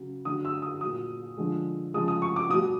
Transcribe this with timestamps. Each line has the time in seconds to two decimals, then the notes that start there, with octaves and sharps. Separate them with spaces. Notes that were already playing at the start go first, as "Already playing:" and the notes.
Already playing: C#3 F#3
0.25 D3 F#3 D#6
0.45 E6
0.62 D#6
0.81 A#2 F#3 D#6
1.37 D3 F3 G#3
1.94 C#3 F3 G#3 D#6
2.08 D#6
2.22 C#6
2.36 D6
2.50 B2 G3 D#6